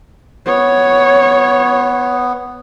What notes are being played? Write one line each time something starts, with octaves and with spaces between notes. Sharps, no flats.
B3 C#5